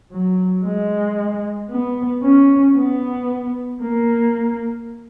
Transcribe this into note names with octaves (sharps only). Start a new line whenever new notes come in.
F#3
G#3
B3
C#4
B3
A#3